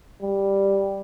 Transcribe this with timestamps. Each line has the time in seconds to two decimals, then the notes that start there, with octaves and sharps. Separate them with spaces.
0.22 G3